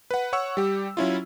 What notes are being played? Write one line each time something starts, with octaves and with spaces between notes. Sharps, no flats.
B4 F#5
C#5 F#5 C#6 E6
G3 G4
F#3 C#4 E4 F4